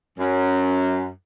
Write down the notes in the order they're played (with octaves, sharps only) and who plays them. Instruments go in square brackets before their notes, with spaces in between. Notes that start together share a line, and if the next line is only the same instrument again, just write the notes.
[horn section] F#2